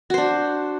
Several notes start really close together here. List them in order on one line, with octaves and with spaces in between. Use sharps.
F#4 C5 D4